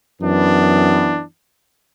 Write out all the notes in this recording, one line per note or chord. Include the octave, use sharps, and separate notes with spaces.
F#2 E3 B3 D4